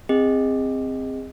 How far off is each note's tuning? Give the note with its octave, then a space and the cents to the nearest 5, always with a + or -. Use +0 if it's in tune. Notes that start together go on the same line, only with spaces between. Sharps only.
C4 +0 G#4 -25 D#5 +0